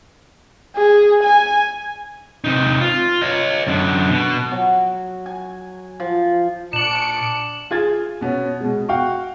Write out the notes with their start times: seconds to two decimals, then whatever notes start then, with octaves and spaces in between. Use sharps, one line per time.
0.76 G#4
1.24 G#5
2.44 C3 D#4
2.81 F4
3.22 C#5 D#5
3.68 F#2 D3
4.10 B2
4.52 F#3
5.26 G#5
6.00 F3
6.73 A#2 D4 C#7 D7 E7 F#7
7.71 F4 G#4 G#6 A6
8.21 B2 B3 C#4
8.61 B2 G#3
8.89 F#4 F5 G5 C#6